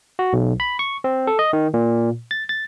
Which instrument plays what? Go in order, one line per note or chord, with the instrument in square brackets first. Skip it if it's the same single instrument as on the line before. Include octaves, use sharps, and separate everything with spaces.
[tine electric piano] F#4
B1
B5
C#6
C4
A4
D#5
D#3
A#2
A6
A6